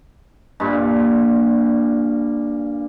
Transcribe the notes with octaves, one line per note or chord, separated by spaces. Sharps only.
G2 A#2